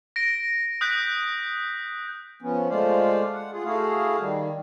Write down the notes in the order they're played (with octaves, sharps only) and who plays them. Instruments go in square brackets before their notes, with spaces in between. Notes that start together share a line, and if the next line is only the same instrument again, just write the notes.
[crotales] A#6 D7
D#6 F#6 G6 B6
[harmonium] F3 B3 C#4
G#3 A3 F4 C5 D5 F5
F#5
F4 G#4
A3 E4 F#4 G#4 F5
D#3 G3